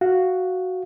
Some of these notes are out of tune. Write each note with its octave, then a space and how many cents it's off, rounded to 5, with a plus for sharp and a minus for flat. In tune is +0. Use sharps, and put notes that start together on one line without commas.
F#4 +0 F5 +0